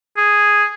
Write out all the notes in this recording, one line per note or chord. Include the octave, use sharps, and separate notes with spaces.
G#4